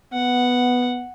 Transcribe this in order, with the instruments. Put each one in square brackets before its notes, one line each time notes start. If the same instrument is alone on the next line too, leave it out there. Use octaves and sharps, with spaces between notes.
[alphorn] B3 [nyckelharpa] F#5